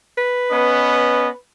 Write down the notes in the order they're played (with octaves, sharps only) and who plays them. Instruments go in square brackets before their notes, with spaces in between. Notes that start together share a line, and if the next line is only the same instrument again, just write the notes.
[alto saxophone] B4
[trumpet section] B3 C#4 D#5